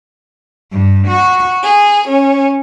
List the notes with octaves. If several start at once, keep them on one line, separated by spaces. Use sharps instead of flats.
G2
F#4
G#4
C#4